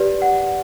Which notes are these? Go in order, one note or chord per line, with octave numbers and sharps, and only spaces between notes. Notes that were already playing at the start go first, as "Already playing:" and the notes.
Already playing: G4 B4 D5
F#5